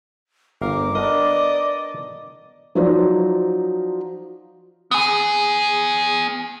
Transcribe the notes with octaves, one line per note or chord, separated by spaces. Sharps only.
G1 A#4 F5 D6
B3 D4 A#4 D5 D#5
F3 F#3 D#4 F4 C5 D5
B3 G#5